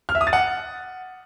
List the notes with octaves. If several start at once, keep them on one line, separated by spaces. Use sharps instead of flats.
F6
E5
D#6
A6
F#5